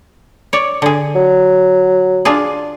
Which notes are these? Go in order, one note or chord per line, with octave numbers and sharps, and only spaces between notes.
C#5 D5
D3 G#4
F#3
D4 F4 G#4